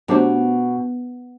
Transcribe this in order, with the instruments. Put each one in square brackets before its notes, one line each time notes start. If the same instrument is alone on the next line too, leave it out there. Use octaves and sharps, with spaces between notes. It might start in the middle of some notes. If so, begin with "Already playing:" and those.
[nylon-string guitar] B2 [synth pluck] F#3 A3 D4 G4 C5